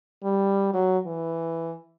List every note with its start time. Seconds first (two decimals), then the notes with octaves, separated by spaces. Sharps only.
0.24 G3
0.74 F#3
1.06 E3